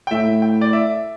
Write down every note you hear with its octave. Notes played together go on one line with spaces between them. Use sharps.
G5
A2 E5
G5
D5
E5